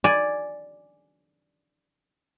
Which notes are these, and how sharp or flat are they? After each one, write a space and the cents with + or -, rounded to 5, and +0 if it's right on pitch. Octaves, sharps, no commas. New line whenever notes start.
D5 +0 G#5 +0